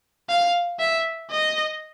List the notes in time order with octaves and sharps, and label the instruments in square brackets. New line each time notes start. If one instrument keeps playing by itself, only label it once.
[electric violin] F5
E5
D#5